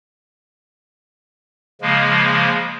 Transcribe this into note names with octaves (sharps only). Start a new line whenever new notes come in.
C#3 F3 G#3 A#3